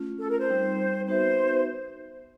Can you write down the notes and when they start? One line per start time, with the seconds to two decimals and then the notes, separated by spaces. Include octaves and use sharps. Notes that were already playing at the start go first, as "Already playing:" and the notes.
Already playing: A3 C#4 F4
0.19 A4
0.29 A#4
0.40 C5
0.49 G3 C4 D#4
1.08 B3 D#4 F#4 B4 C5 E5